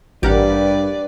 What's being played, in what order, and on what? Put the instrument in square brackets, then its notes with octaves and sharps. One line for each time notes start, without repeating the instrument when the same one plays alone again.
[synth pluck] A1 A#4 F#5 [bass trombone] G2 [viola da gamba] D4 B4 D5 [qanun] G4